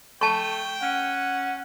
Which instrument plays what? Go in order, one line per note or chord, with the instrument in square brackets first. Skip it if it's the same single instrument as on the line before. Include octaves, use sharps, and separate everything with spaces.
[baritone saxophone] A3 [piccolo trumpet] G5 [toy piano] A5 C#6
[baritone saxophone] C#4 [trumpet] F#5